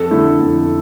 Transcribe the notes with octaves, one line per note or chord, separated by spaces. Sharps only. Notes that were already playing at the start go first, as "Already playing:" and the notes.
Already playing: F2 A4
D3 A3 E4
F2